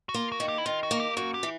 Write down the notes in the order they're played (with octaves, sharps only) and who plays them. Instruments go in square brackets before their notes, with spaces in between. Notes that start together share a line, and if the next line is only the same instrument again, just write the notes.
[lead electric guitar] F#4
[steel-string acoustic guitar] A#3 [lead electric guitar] F4
[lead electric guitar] F#4
[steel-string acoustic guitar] D#3
[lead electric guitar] G4
E4
[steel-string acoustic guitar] D#3 [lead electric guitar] F4
[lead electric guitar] F#4
[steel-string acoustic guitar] A#3
[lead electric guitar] G4
[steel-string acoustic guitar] F#2 [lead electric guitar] F#4
[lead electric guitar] G4
[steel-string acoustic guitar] E3